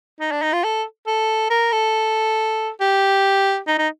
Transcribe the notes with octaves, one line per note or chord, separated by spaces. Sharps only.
D#4
D4
D#4
F4
A4
A4
A#4
A4
G4
D#4
D#4